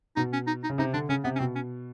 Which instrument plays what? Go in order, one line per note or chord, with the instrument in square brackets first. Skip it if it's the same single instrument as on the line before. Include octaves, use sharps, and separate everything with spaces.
[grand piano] B2 [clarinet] D#4
[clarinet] C#4
D#4
D#4
[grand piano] C#3
[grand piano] C3 [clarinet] D#4
[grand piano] D3 [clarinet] D4
[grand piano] C#3 [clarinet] C#4
[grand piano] C3 [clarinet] B3
[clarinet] C#4
[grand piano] B2 [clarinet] C4
[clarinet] C#4